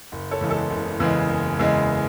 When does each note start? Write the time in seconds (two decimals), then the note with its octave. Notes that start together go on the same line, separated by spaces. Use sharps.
0.12 F#1
0.31 A4 C#5
0.41 E2 C#3 E3 G#3
0.51 A4
0.70 F#1
1.00 E2 C#3 E3 G#3
1.29 F#1
1.59 E2 C#3 E3 G#3